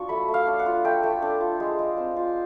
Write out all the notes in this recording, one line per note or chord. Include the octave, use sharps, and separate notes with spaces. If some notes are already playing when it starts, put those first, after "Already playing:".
Already playing: F#3 D4 F4 C#6
A3 B5
A3
F5
D4
F#5
F4
A3 G5
A3
D4
F4
G#3
G#3
C4
F4